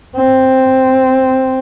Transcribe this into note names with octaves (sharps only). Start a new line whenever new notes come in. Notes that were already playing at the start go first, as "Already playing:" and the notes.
C4